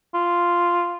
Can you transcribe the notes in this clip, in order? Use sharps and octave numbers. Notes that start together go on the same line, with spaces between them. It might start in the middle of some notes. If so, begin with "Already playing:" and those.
F4